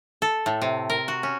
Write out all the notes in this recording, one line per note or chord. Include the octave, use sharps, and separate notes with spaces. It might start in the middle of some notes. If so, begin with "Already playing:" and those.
A4
A2
C3
A#4
F#4
C#4